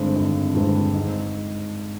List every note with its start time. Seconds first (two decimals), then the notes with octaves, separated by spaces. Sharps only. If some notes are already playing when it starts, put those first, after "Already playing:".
Already playing: G#1 G2 D3 G#3 C4
0.16 G#1
0.55 G2 D3 G#3 C4
0.94 G#2